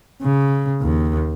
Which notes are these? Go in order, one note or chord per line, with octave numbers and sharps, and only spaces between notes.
C#3
D#2